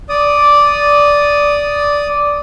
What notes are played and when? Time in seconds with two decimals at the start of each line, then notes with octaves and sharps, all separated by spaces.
0.09 D5 D#6